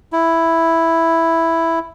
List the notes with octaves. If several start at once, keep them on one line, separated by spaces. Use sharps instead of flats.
E4